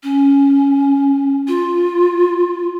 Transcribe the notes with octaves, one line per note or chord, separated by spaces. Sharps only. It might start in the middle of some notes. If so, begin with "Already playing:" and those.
C#4
F4